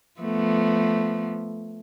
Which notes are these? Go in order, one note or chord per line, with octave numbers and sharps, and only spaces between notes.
F3 A3 B3